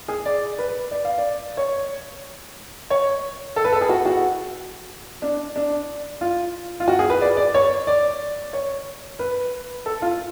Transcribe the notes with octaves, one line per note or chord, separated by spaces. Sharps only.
G#4
D5
B4
D5
F5
D5
C#5
C#5
A4
B4
A4
G#4
F#4
F#4
D4
D4
F4
F4
F#4
G#4
B4
D5
D5
C#5
D5
C#5
B4
A4
F4